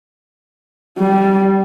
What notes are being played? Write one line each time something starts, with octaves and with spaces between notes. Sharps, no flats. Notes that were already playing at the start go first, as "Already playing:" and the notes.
G3